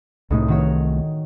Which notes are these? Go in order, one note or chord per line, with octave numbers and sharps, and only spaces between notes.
C2 A2 C3 A3 D#4
D#3 F#4 C#5